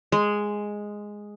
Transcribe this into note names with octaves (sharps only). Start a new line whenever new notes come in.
G#3